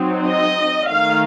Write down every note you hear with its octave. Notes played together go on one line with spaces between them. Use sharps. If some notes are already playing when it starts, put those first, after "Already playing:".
Already playing: F#3 C4 D#4
D#5
D#3 A3 D#4 F5